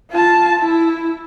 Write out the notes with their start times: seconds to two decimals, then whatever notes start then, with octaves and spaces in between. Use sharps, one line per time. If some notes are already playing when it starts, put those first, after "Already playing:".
0.11 F4 A5
0.60 E4